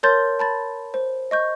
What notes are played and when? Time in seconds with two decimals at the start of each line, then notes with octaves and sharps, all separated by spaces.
0.03 A#4 C#5 A5 C6 G6 A6
0.39 A5 B5 A6
0.94 C5
1.31 D#5 C#6 G6